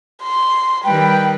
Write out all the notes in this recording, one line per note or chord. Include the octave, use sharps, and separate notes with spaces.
C6
D#3 G3 B4 G5